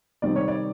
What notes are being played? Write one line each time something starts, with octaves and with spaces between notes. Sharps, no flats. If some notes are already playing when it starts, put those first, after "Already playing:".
C3 D#3 G3 C4 D5
C#5
D5